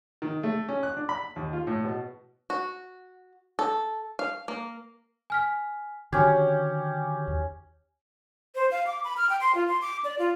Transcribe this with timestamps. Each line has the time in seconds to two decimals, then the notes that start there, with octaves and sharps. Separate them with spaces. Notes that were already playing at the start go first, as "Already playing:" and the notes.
0.22 D#3
0.43 A3
0.68 C#4
0.83 F#6
0.97 D4
1.09 B5
1.36 D#2
1.53 F4
1.67 A2
1.84 B2
2.50 F#4
3.59 A4
4.19 F5
4.48 A#3
5.30 G#5 F6 B6
6.12 D3 D#3 F#3 C#4 F#4 G4 G#6
7.28 D#2
8.55 C5
8.71 F5
8.87 D6
9.04 B5
9.17 F6
9.30 G5
9.41 C6
9.55 F4
9.67 C6
9.82 D6
10.04 D5
10.19 F4